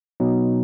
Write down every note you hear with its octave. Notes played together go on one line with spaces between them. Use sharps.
B2 F#3 B3 D#4